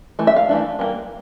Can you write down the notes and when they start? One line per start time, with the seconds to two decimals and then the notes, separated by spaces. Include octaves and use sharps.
0.19 E3 A3
0.27 E5
0.36 F5
0.49 E3 A3 D4
0.79 E3 G3 A#3